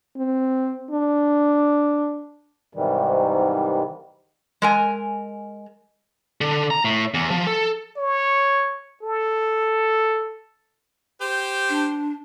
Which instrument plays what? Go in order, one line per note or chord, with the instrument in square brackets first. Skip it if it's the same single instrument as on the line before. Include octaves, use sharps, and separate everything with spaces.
[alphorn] C4
D4
[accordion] G#2 C3 D#3 E3 G3
[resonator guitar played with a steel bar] G#3 A#4 G#5
[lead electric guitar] D3
A#5
A2
E2
F3
A4
[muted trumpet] C#5
A4
[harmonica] G4 C5
[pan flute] D4